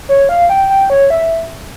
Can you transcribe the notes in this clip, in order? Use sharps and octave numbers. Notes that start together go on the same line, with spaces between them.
C#5
F5
G5
G5
C#5
E5